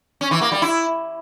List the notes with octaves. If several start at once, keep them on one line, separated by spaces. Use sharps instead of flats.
C#4
E3
A#3
G3
E4